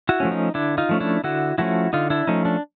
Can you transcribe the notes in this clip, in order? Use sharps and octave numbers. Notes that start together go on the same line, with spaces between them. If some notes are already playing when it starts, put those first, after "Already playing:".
E4 F#4
F3 A3 C#4
D#4
D3 D4 E4
D#4 F4
F3 A3 C#4
D4 E4
D3 E4 F#4
F3 A3 C#4 E4 F#4
D3 D#4 F4
D4 E4
F3 A3 C#4 D#4
D4